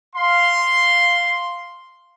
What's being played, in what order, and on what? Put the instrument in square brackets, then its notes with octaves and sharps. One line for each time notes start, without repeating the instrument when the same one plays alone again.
[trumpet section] F5 C6